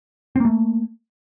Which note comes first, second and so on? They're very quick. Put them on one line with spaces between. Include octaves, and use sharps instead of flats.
C4 A#3 A3